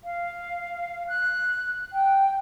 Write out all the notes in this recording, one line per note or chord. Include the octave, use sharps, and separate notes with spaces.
F5
F#6
G5